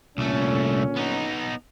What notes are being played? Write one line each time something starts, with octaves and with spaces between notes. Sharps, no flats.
C2 A#2 D3 A3 C#4
B3 D#4